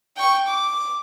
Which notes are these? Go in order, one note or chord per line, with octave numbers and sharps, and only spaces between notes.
G5 C#6
D6